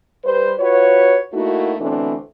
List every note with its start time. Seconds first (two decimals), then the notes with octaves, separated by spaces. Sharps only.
0.24 G3 B4 C5
0.59 F4 F#4 B4 C#5
1.34 A3 A#3 D#4 E4 F#4
1.80 B2 D3 E3 A3 C4 D4